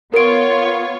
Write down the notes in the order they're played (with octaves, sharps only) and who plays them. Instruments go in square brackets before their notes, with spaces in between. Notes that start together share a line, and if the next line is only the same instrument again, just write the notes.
[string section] B3 F4 C#5 [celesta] A#4 D7